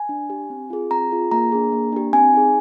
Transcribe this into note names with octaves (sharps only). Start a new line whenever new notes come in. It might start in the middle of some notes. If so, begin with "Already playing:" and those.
Already playing: G#5
D4
G4
C4
F4 G#4
C4 A#5
F4 G#4
A#3 A#5
D4 G#4
A#3
D4 G4
C4 G#5
D#4 G#4